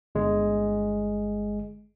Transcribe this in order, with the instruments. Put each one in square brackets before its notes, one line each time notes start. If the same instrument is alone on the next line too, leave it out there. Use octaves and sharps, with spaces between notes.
[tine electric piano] G1 G#3